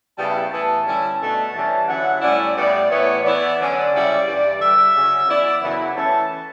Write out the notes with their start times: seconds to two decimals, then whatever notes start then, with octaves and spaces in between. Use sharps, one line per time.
0.17 C#3 G3 B3 E4 A5
0.50 A2 E3 B3 A5
0.85 D3 G3 C#4 E4
1.19 B2 A3 D4 A5
1.53 E3 G3 C#4 A5
1.87 D3 F#3 C#4 E4 F#5
2.20 A2 G3 C#4 E4 D5
2.55 A2 G3 B3 D5
2.89 A2 E3 B3 E4 C#5
3.23 E3 B3 E4 D5
3.57 D3 F#3 C#4
3.91 C#3 G3 C#4 E4
4.25 G2 E3 G3
4.59 D3 G3 D4 E5
4.93 C#3 F#3 C#4
5.27 E3 B3 E4 D5
5.61 F#2 C#3 F#3 B3 E4
5.95 E3 A3 C#4 E4 A5